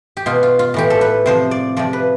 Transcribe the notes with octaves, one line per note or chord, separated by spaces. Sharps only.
G4
B2 F4
F4
F4
A2 E3 G4
A4
B4
C3 F3 C5
D5
C3 F3 D5
B4